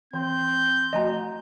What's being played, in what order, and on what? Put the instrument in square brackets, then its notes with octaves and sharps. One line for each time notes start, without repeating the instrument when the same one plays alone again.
[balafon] E3 [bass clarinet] C4 [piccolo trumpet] G6
[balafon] F3 A3 F#4 [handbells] D#5 G#5 A#5